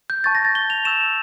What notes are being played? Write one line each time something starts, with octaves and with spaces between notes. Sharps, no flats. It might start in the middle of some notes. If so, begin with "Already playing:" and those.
G6
A5 C#6 G6 A6
A#6
A6
G7
F7
C#6 E6 G6 E7